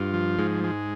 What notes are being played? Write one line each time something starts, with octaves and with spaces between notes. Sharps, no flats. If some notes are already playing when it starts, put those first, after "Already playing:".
Already playing: G2 F4
F3
G#2 G#3
G#3